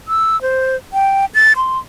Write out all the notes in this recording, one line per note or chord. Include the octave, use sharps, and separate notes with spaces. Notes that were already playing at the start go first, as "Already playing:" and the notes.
E6
C5
G5
A6
C6